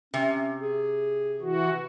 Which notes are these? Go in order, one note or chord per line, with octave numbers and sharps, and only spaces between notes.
C3 C#4
G#4
E3 F#4